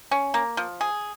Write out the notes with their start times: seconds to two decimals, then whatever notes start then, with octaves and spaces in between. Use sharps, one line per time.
0.11 C#4
0.34 A#3
0.57 F3
0.81 G#4